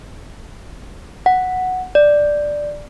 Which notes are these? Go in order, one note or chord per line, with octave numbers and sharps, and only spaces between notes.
F#5
D5